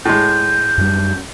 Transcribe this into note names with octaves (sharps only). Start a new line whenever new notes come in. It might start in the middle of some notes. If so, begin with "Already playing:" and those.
A2 G#3 G6
F#2 G3